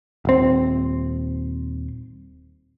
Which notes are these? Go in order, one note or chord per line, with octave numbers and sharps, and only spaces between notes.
D#1 C4